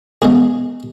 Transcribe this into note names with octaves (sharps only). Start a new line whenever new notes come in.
E2 C#3 G#3 G#4